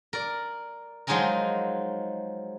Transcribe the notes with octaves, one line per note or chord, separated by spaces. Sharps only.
A#4 D5
F3 F#3 G#3 D#4 G#4 A#4